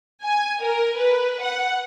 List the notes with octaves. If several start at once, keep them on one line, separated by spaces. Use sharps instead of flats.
G#5
A#4
B4
F#5